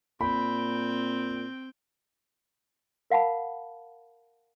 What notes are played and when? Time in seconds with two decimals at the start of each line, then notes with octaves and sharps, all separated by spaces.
0.21 A#2 C4 G5 B5
3.10 A#4 F5 F#5 A5 B5